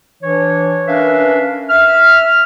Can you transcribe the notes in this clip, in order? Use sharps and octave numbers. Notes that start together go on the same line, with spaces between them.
E3 D4 C#5
C#4 D4 A#4 B4 E5 F5
E5 F6